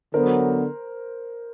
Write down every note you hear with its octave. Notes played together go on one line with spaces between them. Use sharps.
D3 F#3 B3 A#4 C5